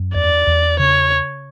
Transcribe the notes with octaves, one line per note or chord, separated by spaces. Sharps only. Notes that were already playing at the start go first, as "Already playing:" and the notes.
Already playing: F#2
E2 D5
E2
C#3 C#5